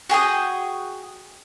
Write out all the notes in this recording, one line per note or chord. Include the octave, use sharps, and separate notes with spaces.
F#4 G#4 G5 D#6